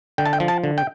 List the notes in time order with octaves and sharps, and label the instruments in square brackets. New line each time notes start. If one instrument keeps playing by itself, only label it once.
[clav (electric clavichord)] D3 G5
A5
G5
F3
A5
D3
G5